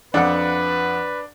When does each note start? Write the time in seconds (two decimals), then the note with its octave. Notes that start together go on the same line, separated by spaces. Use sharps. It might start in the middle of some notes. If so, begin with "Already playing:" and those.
0.14 F2 D4 B4 F#5